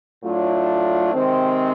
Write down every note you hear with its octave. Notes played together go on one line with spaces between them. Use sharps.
A2 F#3 A3 D4 F4
C3 D#3 G#3 C4